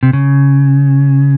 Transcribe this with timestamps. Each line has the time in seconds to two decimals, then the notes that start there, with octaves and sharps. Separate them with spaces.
0.03 C3
0.13 C#3